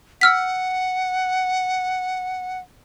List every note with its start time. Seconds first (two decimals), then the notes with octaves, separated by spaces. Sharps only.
0.21 F#5 E6 F6 B6